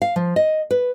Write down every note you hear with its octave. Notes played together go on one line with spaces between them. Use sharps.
F5
F3
D#5
B4